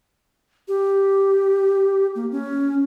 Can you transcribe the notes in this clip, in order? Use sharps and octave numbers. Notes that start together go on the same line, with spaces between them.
G4
A#3
C#4